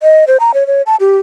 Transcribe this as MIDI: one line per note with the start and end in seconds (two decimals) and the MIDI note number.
0.02 0.25 75
0.27 0.37 72
0.40 0.51 82
0.54 0.67 73
0.67 0.82 73
0.86 0.96 81
1.00 1.18 67